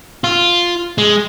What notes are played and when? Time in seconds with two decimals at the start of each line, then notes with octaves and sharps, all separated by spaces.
0.24 F4
0.98 G#3